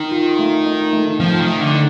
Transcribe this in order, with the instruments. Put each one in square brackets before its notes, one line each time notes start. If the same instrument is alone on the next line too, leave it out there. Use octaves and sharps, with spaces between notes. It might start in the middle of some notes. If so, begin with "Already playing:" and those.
Already playing: [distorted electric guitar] D#3
[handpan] F4
A3
D#4
A3
[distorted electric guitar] F3 [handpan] C4
[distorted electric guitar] D#3
[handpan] A3
[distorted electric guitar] D3
[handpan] D#4